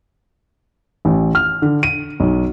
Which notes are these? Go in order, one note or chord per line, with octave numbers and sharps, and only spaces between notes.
A1
F6
D3
D#7
B1